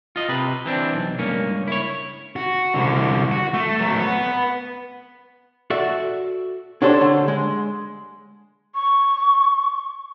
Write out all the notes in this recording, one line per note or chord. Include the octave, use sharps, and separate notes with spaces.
F4 D#5
C3 B4
E3 C4 D4
B1
C#2 G2 A#3 C#4
E4 C#5
F#4
C2 D3
F#4
A3
F#3 A3
B4 F#5
F#4 A4 D5 E5
C#4 D4 G4 A4 C5 C#5
D3
G#3
C#6